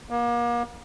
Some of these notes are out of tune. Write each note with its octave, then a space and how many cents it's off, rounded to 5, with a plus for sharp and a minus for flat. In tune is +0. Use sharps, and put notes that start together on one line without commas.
A#3 +35